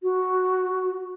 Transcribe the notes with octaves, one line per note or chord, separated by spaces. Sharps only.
F#4